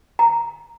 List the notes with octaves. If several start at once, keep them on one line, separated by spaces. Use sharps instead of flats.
A#5